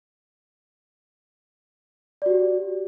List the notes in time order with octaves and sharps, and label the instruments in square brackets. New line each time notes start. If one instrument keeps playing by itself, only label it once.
[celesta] D5
F#4
G4